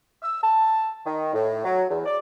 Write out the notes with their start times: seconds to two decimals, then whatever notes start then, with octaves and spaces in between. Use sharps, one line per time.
0.23 E6
0.43 A5
1.05 D#3
1.33 A2
1.65 F#3
1.90 E2
2.06 D5